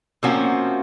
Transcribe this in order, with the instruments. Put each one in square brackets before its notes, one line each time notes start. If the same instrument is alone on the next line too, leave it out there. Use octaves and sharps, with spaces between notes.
[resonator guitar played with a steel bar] C3 F3 A#3 C#4 F#4